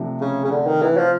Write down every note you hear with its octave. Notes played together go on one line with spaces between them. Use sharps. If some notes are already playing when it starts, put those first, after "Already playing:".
Already playing: C3 F3 A3 D4
C#3
C#3
D3
D#3
E3
F3